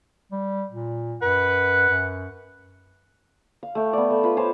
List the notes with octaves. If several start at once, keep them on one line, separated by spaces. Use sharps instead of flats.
G3
A#2
F#2 B4 F#5
F#2
F5
A3 G5
B3 D5
A3
F4 B4
C5 C#5 A5